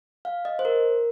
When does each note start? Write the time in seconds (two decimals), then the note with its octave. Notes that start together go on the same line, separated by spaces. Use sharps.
0.25 F5
0.45 D#5
0.59 C5
0.65 A#4